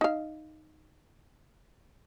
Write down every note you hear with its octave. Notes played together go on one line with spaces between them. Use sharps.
D#4 F5